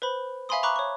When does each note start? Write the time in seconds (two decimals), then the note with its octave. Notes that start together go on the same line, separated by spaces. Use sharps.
0.02 B4 C5 B5
0.49 E5 F5 G#5 B5 C6 D#6
0.63 A#5 B5 C#6 D6 F#6
0.76 C#5 C#6